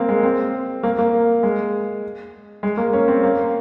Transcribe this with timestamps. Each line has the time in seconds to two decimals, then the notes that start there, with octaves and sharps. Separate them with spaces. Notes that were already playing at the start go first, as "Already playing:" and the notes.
Already playing: A#3 C4
0.09 G#3
0.23 C4
0.83 A#3
0.98 A#3
1.43 G#3
2.63 G#3
2.77 A#3
2.93 C#4
3.08 C4
3.23 A#3